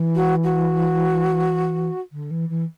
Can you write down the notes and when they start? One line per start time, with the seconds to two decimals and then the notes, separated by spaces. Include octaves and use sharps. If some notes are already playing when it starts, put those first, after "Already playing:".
Already playing: E3
0.16 F#4
0.44 F#4
2.12 D3
2.30 E3
2.49 E3